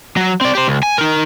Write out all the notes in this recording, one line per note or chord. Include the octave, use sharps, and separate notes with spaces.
F#3
C4 D5
G4 C5
C#2
G#5
D#4 A#4